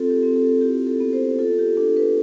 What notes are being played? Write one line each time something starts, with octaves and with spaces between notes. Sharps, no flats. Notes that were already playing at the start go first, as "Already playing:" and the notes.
Already playing: C4 F4 A4
G4
C4
A4
E4 G4
A4
B3
C5
F4 A4
G4
D4 A4
B4